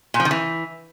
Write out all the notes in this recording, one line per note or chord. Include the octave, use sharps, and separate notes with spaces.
A#2
F3
D#3
E3